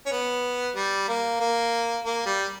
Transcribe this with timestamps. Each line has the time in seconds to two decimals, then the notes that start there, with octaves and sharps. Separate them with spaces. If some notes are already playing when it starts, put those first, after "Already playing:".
0.06 C#4
0.11 B3
0.76 G3
1.08 A#3
1.40 A#3
2.05 A#3
2.26 G3